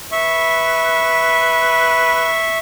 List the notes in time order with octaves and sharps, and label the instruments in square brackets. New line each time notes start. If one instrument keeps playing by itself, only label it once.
[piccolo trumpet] B4 [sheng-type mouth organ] E5 C#6